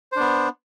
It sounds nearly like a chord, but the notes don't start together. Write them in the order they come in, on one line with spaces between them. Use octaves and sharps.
C5 D4 B3